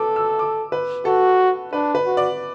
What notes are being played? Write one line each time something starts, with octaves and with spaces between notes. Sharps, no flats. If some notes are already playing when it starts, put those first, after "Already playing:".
Already playing: A4 B4 D6
E6
D6
B4
F#4 A4
D4 B4
B4
F#4
D5